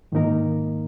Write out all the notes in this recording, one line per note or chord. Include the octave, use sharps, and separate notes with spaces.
G#2 D#3 A#3 D#4 A#4